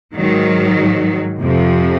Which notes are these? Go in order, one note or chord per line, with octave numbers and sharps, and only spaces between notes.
G#2 D#3 F#3
F2 C3 F3